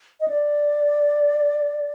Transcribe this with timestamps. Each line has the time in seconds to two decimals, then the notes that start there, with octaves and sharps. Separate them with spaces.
0.20 D#5
0.28 D5